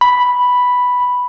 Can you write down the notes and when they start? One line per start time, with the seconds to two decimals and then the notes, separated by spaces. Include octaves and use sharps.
0.01 B5